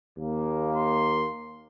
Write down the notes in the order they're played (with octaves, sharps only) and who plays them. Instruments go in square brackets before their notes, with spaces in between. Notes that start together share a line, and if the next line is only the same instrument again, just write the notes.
[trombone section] D#2 A#3
[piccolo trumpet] C6